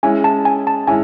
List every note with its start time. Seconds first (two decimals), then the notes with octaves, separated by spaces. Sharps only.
0.03 G#3 C#4 E4 G#5
0.24 A5
0.45 G#5
0.67 A5
0.87 G#3 C#4 E4 G#5